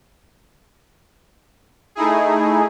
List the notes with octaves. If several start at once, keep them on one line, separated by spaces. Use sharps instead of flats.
A3 D#4 E4 G#4